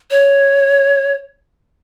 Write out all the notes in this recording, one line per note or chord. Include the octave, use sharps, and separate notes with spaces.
C#5